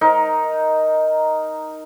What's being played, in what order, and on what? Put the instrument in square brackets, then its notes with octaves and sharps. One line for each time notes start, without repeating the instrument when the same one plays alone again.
[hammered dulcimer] D#4 A#4